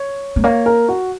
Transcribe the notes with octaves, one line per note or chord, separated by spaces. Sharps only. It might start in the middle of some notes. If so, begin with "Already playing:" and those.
Already playing: C#5
A3
A#3 C#5
A#4
F#4